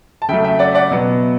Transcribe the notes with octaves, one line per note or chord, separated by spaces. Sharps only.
A5
C#3 F#3 A3 E5 G5
E5 G5
D5 F#5
D5 F#5
B2 F#3 B3